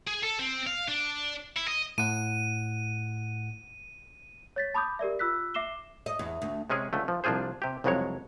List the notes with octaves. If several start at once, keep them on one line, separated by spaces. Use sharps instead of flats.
G#4
A4
C4
F5
D4
E4
D#5
A2 F#5 D#7
C#5 A6 B6
A5 B5 D6 D#6 G6
G4 A#4 D5 E5
F4 E6 F#6 B6
E5 D6 C7 E7 G7
D#5
E2
D2
C3 G#3 C#4 G#4
C#2 D3 A3
F3
C2 F3 D4 F4 G#4 C5
C3 G4
C2 F2 C#3 F#3 G#3 C#5